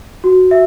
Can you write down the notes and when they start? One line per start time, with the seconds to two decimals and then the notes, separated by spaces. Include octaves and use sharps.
0.24 F#4
0.51 E5